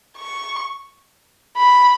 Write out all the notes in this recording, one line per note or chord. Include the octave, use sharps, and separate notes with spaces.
C#6
B5